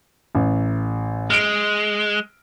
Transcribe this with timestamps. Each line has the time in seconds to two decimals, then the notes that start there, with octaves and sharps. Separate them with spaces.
0.35 A1
1.30 G#3 F6 D7